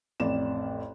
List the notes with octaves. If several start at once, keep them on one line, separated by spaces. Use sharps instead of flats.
A1 F2 D5 E7